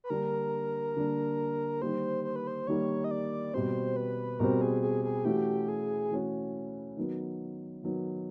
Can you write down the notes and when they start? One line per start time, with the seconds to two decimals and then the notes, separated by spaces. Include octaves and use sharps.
0.04 B4
0.10 D3 G3 A#3 D4 A#4
0.96 D3 G3 A#3 D4
1.81 D#3 G3 A#3 C5
2.24 C5
2.36 B4
2.47 C5
2.67 D#3 G3 A#3 C#5
3.04 D#5
3.11 D5
3.53 B2 G3 C4 C5
3.96 B4
4.39 B2 G3 C4 A#4
4.61 G#4
4.82 G#4
5.04 G#4
5.25 E3 A3 C#4 F#4 G4
5.68 G#4
6.11 E3 A3 C#4 F#4
6.97 D#3 F#3 B3
7.84 D#3 F#3 B3